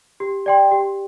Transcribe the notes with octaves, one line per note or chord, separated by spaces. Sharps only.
G4
D5 G5 C6
G4